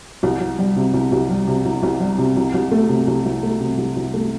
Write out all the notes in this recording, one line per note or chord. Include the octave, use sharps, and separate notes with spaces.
C2
C2
G3
C3
C2
C2
G3
C3
C2
C2
G3
C3
C2
C2
A3
C3
C2
C2
A3
C3
C2
C2
A3